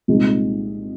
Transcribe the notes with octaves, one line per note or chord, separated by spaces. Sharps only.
C2 A#2 G#3 D#4